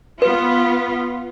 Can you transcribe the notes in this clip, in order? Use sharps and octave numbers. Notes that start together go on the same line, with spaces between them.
B3 F4 B4